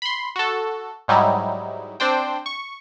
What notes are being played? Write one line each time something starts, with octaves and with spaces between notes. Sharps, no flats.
B5 C6
F#4 A4
G#2 F#3 G3 D#4 E4
C4 D4 C5 G5
C#6